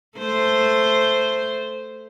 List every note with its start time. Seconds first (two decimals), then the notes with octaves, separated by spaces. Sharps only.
0.18 A3 C5